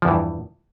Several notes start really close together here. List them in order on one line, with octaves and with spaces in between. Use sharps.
F3 E2 E3 G2